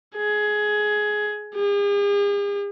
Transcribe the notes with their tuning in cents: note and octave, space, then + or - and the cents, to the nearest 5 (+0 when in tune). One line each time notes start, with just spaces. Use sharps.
G#4 +15
G#4 -45